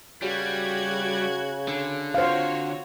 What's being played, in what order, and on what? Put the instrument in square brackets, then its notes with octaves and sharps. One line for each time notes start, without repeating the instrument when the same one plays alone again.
[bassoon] C#3 [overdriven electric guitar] G3 [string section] F#4 F#6 G#6
[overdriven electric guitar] D3
[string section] F4 F#4 C#5 [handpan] C5 F5